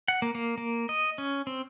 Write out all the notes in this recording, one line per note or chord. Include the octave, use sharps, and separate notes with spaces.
F#5
A#3
A#3
A#3
D#5
C#4
C4